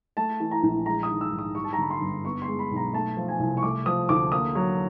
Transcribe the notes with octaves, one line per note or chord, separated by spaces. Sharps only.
A3 A5
E3
A#5
A#1
G#3 A#5
D#6
D#3
E6
G#1
D#6
G3 C#6
A5
A#5
D3 B5
C6
G1
B3 C#6
C6
G#3
B5
B1
A#5
A3 A5
F3
G#5
C2
C#6
A3 D6
F3 D#6
D2 D6
A#3 D#6
F#3